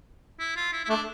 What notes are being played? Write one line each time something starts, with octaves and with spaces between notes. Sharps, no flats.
E4
F4
E4
E4
A3 D4